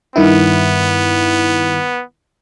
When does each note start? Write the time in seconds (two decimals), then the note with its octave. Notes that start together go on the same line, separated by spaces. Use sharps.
0.16 G2 D#3 B3 E4